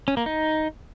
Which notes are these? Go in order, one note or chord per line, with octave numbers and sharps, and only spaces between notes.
C#4
A#3
D#4